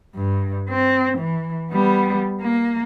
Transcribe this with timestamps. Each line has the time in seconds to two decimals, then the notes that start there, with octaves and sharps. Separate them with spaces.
0.15 G2
0.69 C4
1.18 E3
1.72 G3 B3
2.40 A#3